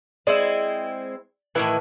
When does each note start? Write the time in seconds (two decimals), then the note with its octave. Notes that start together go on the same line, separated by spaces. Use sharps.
0.27 G#3 C4 E4 D5
1.55 A2 D#3 E3 B4